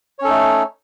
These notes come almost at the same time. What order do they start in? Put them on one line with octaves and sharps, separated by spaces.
C#5 C#4 A4 D#4 A3